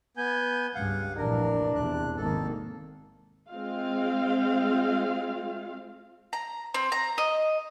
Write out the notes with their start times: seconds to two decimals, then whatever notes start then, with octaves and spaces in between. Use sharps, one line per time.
0.17 B3 G#5 G6
0.75 C#2 G2 F5 F#5
1.17 F1 A#1 E3 D4 A#4
1.76 E2 C3 F#6
2.17 G#1 D#3 A#3 A4
3.51 G#3 C4 F4 F5
6.33 A#5
6.74 C4
6.92 A#5
7.18 D#5